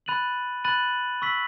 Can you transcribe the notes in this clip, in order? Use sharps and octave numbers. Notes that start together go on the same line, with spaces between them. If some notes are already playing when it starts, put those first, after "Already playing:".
B5 F#6 A6 D#7 F#7
B5 F#6 A6 D#7 F#7
C#6 E6 B6 F#7